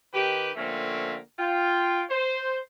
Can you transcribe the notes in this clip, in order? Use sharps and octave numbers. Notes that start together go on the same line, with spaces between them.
D#3 G4 B4
D3 F3 A3 A#3 C4 C#4
F4 G5
C5